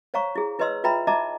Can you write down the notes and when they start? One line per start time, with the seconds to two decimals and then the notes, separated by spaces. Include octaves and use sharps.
0.14 C5 C#5 F5 A#5 C#6
0.36 E4 G#4
0.59 E4 B4 C#5 D#5 C6 E6
0.84 F4 B4 E5 G5 A#5 B5
1.07 D#4 D#5 E5 A5 A#5 D6